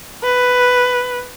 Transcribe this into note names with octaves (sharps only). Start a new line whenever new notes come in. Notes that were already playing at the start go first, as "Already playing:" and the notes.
B4